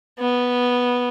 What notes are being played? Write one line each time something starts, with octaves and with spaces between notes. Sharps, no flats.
B3